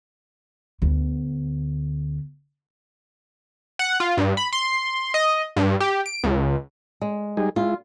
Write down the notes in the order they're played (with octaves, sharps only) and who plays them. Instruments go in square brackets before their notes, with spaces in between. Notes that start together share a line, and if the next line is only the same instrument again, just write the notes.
[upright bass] D2 B3
[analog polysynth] F#5
F4
G2
B5
C6
D#5
G2
G4
D7
C#2
[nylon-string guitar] G#3
[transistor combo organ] G3 D#4 G#4
[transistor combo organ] G#3 E4 [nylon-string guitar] F4